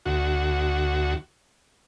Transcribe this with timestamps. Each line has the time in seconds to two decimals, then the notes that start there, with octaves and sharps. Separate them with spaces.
0.06 D2 F#4